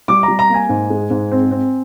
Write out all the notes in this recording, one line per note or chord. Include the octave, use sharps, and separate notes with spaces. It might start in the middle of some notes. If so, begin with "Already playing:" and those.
G3 D6
A#5
G3
A#5
A#3 G#5
G#2
G#3
G#2
C4
C4